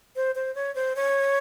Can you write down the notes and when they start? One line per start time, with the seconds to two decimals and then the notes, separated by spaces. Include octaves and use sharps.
0.16 C5
0.35 C5
0.55 C#5
0.75 C5
0.96 C#5